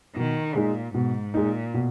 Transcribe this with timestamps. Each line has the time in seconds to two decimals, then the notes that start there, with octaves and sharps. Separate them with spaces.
0.16 B2 D#3
0.55 A#2 G#3 D#4
0.94 G#2 B2
1.34 A#2 G#3 D#4
1.74 B2